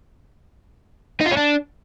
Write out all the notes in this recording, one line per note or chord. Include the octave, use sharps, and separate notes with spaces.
D#4
F4
C#4
D4